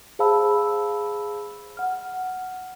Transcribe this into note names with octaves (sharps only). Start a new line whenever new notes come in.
G#4 C5 F5 A5 B5 E6
F#5 F6